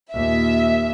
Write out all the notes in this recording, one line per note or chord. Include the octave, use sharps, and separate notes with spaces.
D#2 A#2 E5